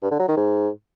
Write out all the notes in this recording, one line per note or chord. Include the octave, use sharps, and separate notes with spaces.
G2
D3
F#3
D#3
G#2